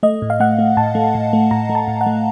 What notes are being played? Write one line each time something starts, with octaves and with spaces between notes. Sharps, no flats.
A3 D#5
A2
F5
A3 F#5
A3
A2 A5
A3
A2
A3
A2 A#5
A3
A5
A2
F#5
A3